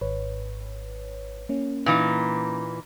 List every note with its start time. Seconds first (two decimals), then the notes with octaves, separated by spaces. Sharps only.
0.01 G#1 B4 C#5
1.49 A#3 C#4
1.86 A#2 E3 D#4